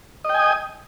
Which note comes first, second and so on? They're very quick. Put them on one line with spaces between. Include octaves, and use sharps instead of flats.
D#5 G5 G#5 D#6